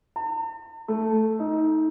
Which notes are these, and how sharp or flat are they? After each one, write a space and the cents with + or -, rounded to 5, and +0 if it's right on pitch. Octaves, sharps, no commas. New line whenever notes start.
A5 +45
A3 +0
D#4 +20